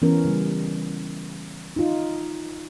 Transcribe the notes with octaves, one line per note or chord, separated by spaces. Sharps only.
E3 B3 C#4 A#4
C#3 G3
D#4 F4